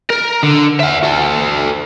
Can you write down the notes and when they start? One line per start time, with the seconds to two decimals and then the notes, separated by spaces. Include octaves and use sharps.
0.10 A#4
0.43 D3
0.80 E5 F#5
1.03 F#4 A4